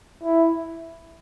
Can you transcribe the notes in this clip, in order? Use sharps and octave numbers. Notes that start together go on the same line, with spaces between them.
E4